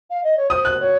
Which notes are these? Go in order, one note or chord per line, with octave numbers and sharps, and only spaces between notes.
F5
D#5
C#5
C5 D#6
F#6
C#5